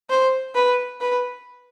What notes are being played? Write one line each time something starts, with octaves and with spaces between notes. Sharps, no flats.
C5
B4
B4